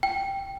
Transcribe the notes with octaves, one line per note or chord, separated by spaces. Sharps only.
G5